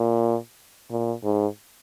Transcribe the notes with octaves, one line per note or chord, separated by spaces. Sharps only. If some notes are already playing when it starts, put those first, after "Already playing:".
Already playing: A#2
A#2
G#2